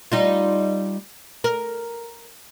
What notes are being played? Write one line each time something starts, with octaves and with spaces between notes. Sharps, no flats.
G3 D#4 F4
A#4